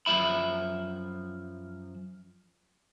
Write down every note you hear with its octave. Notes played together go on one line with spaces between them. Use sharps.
F#2 F3 E5 B5